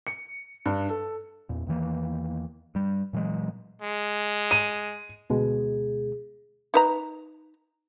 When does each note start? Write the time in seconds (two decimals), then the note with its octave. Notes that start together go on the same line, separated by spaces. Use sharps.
0.07 C#7
0.66 G2
0.89 A4
1.49 E2 A#2
1.67 E2 D#3 E3 A#3
2.75 G2 G3
3.13 A#2 E3 F#3 G#3
3.82 G#3
4.51 D#7
5.30 D2 B2 G#3 G#4
6.74 D#4 B4 A#5